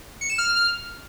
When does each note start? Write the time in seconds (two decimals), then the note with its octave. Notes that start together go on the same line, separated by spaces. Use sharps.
0.21 C#7
0.30 E7
0.38 F6